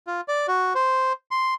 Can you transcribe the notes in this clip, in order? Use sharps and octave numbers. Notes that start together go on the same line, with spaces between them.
F4
D5
F#4
C5
C6